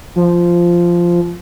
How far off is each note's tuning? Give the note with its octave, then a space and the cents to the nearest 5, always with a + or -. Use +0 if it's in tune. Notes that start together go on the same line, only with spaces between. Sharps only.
F3 -10